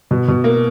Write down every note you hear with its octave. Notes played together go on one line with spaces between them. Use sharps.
B2
B2
A#3